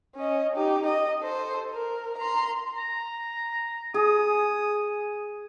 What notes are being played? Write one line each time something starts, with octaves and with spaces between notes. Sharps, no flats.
C#4 D#5
D#4 G4
D#5
A4 C5
A#4
A#5 C6
A#5
G#4 D#6